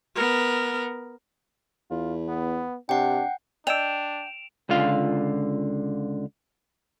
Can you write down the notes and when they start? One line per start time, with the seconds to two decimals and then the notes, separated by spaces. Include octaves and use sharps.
0.15 B3 A#4
1.91 E2 F4
2.28 B3
2.89 C3 D4 F#5 G5
3.67 D4 D5 D#5 G5 E6 D7 E7 F7
4.69 C#2 D3 F4 F5